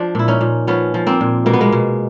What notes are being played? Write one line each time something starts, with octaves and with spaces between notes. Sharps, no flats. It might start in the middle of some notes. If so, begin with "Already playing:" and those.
Already playing: F3 D4
A#2 E4
C#4 D#4
A#2
F3 B3 C#4
F3
A#3 C4
A#2
B2 A#3
B3
G#3 A#3
B2